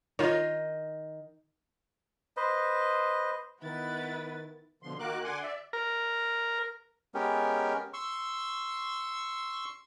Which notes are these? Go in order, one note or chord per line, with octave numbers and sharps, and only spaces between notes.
D#3 F4 C#5 D#5
B4 C5 D#5
D#3 B3 E4 B4 A6
B2 D3 F3 C6
D#3 A#3 F#4 A#4 D6 F#6
D3 F#5 G#5 C6 D6
D5 E5
A#4
G#3 B3 C#4 G4 A#4
C6 C#6 E6